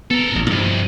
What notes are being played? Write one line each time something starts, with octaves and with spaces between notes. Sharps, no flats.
B3 A4 A#4
A1 G2 A#2
G2 C3 E3 F3